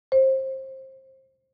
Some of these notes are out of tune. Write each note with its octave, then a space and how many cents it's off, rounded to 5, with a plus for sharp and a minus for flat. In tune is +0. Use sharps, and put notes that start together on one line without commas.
C5 +25